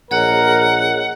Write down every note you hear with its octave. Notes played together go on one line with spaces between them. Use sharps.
A#1 G#4 A#4 C#5 D#5 F#5